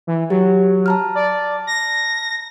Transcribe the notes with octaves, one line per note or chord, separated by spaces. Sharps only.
E3
F#3 G4
A5 A#5 F6
D5
A#6